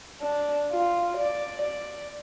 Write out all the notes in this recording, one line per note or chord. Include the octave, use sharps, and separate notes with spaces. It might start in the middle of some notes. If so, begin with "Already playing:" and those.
D4
F4
D5
D5